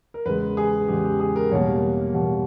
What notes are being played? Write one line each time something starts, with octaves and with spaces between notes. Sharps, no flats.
A#4
E2 C#3 G#3 B4
G#4
E2 C#3 G#3 G4
G4
G#4
A#4
E2 B2 G3 A#3 C#5
E2 B2 G3 A#3